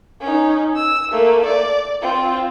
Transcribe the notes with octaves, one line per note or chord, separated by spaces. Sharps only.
C#4 D#4
E6
A3 A#3
D5
C4 F4